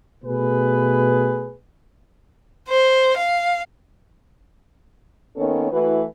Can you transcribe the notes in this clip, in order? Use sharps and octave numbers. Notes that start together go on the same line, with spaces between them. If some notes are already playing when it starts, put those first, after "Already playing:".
B2 A3 G#4 B4
C5
F5
D#3 A#3 B3 C#4 A4 C#5
E3 A3 E4 F#4 B4